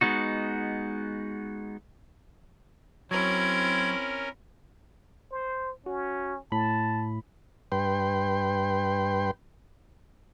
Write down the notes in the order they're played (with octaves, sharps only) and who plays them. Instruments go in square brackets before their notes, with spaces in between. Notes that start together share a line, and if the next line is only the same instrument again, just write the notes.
[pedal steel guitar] G#3 B3 D#4 F#4
[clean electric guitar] F#3 [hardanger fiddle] C4 E4 [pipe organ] C#4 A#4 [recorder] G#6
[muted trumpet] C5
[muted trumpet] C#4 [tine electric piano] F#4
[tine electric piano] A2 B5 [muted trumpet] A5
[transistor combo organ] G2 B4 G5 C6